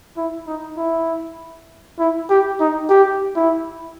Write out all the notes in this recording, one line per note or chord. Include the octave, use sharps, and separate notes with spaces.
E4
D#4
E4
E4
G4
D#4
G4
E4